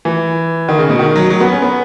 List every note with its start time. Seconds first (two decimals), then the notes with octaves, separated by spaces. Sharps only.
0.05 E3
0.69 D#3
0.78 C#3
0.89 B2
0.99 D#3
1.16 F#3
1.30 F#3
1.41 B3
1.52 C#4
1.62 B3